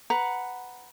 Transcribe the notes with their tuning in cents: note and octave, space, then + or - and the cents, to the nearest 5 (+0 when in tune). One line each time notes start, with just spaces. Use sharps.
B4 +5 F#5 +0 A#5 +10